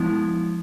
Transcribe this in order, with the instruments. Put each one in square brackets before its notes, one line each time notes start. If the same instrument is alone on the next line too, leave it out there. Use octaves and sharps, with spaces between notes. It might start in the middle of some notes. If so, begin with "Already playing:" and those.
Already playing: [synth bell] F3 G#3 B3 E4